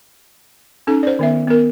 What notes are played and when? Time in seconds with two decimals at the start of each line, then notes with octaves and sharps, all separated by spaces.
0.87 C#4 D#4 A4
1.03 C5 D5
1.19 D#3 B3 E5
1.48 B3 A#4